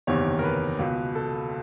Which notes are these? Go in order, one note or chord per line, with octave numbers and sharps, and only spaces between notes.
F#1 E2 C3 D#3 C#5
A#4
B4
C#2 B2
A4